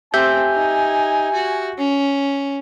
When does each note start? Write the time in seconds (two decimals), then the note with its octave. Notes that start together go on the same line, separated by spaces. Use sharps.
0.14 A3 C4 G4 E5 G#5 G6
0.53 D#4
1.34 F#4
1.78 C#4